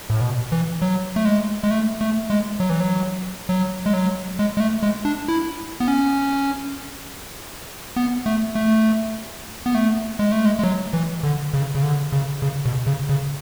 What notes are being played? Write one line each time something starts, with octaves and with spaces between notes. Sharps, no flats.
A2
B2
E3
F#3
A3
G#3
G#3
A3
A3
G#3
F#3
E3
F#3
F#3
G#3
F#3
G#3
G#3
A3
G#3
D4
E4
B3
C#4
B3
A3
A3
B3
A3
G#3
A3
G#3
G#3
F#3
E3
D3
C#3
C#3
D3
C#3
C#3
B2
C#3
C#3